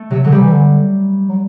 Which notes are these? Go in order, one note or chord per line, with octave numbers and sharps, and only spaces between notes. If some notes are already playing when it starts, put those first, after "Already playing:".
Already playing: A3
C3 F#3
D3 F#3
C3 G3
E3
D3
F#3